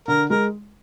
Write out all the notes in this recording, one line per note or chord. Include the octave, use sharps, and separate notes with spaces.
D3 A#4
G#3 A#4